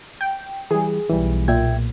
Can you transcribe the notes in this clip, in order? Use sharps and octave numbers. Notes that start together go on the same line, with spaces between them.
G5
E3 G3 G#4
B1 E3 G3
A#2 E5 G5 G#6